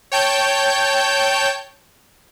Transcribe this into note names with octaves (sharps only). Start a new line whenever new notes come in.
C#5 G5 A5 G6